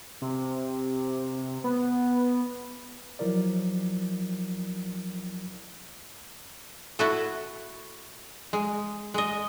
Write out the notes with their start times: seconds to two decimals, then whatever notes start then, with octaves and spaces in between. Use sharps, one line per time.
0.22 C3
1.64 B3
3.19 F3 F#3 E4 A#4 D5
6.99 E4 F#4 A4
8.53 G#3
9.14 G#3 D#5